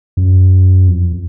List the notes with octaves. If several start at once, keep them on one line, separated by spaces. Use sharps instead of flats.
F#2
F2